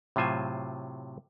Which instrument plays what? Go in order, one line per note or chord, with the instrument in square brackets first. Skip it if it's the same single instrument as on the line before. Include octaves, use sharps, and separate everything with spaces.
[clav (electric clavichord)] A2 C3 F#3 F4 C5 G#5